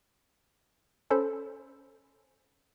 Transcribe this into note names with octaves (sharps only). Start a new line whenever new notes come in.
C#4 A4 C5 B5